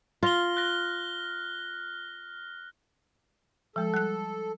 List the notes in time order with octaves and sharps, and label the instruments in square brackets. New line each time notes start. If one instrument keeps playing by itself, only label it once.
[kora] F4 [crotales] F6 A#6 G7
[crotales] F#6 A#6
[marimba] F3 G#3 [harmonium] A4
[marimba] G3 F#6